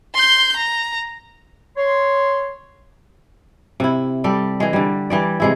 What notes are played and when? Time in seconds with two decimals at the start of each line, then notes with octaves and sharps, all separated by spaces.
0.14 C6 G6
0.56 A#5
1.77 C#5 C6
3.80 C3 E4
4.24 G3 A4 D5
4.60 E3 G#3
4.73 D3 G3
5.10 E3 G3 D5
5.40 C3 G#3 E4